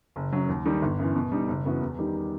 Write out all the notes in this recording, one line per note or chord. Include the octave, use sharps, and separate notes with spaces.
F#1
F#2 F#3
D#2
D#3 G3 D#4
G1
F#2 E3
B2
G3 D#4
F#1
F#2 E3 B3 F#4
E2
D#3 G3 D#4 G4